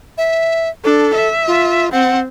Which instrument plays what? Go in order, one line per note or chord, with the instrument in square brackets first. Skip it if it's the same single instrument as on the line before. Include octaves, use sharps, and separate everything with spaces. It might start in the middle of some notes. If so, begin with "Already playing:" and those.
[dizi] E5
[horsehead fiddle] D4 [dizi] A4
[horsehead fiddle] E5
[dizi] F4
[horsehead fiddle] C4 [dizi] F#5